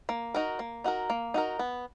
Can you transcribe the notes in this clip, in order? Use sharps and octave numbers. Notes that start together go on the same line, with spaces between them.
A#3
D#4 F#4 A#4
A#3
D#4 F#4 A#4
A#3
D#4 F#4 A#4
B3